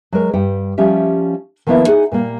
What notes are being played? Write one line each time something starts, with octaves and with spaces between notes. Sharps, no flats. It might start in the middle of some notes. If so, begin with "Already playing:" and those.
F#3 G#3 A#4
G2 G3 F#5 G5
F3 G3 C#4 G4 E5
D#3 F3 A#3 B3 E4 F4
D#4 G#4 F#5 G#5
A#2 G3 A#3